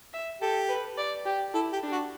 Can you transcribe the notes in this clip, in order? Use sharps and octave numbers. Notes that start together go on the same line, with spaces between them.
E5
G4 A4
B4
D5
G4
E4 A4
G4
D4
F#4